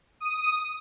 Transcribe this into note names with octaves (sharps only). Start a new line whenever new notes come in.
D#6